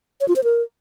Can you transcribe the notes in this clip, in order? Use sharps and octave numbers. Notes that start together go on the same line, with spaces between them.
C#5
F4
C5
A#4